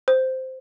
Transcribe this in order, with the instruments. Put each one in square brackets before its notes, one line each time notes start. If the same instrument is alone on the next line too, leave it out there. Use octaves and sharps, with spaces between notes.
[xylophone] C5